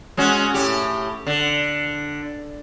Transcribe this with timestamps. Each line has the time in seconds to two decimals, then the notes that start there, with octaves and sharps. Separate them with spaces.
0.17 G#3 C#4 F#4
0.54 A2 G4
1.27 D3